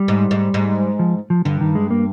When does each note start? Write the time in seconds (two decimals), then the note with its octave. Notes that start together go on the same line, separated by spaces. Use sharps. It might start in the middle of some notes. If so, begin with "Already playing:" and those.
Already playing: G3
0.08 G#2
0.31 G#2
0.54 G#2
0.99 F3
1.30 F3
1.45 G2 D3
1.61 D#3
1.75 G#3
1.91 A#3